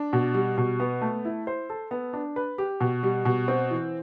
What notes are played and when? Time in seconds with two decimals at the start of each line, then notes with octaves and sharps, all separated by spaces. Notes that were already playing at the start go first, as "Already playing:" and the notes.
Already playing: D4
0.13 B2
0.34 G3
0.58 B2
0.80 B3
1.01 A3
1.25 E4
1.47 C5
1.70 A4
1.91 B3
2.13 D4
2.36 B4
2.58 G4
2.81 B2
3.03 G3
3.25 B2
3.48 C4
3.71 E3